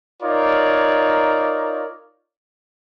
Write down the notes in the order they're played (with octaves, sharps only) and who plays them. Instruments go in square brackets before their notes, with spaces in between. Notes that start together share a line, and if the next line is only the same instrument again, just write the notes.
[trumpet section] D#4 F4 A#4 C#5 D5